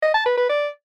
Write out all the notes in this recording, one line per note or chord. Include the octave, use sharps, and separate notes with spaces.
D#5
A5
B4
B4
D5